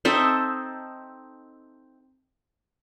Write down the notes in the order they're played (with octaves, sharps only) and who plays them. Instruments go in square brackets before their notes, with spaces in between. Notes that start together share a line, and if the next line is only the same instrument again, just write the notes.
[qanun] C4 D#4 A4 E5